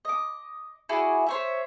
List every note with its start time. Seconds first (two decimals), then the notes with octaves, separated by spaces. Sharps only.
0.05 D#5 D6
0.89 E4 F#4 G#4 D5
1.27 C5 C#5 E5